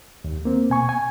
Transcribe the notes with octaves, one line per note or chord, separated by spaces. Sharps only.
D#2
A#3 C4
B2 G#5 C#6
G#5